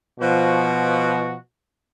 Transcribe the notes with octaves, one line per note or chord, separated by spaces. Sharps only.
B2 F3 F#4